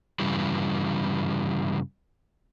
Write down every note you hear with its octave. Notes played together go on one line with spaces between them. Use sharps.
G2 C#3 E3 G3